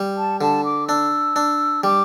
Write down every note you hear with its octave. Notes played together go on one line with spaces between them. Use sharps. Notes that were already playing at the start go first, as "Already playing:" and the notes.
Already playing: G3
A5
D3 A5
D6
D4 E6
D4
G3 D6